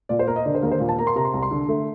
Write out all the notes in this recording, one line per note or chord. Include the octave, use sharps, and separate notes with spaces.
A#2 D5
C5
A#3 A#4
D#5
D3 D5
C5
D#2 A#4
C5
A#2
A5
A#3 A#5
C6
C3 A#5
C6
C2 A#5
C6
D3
A3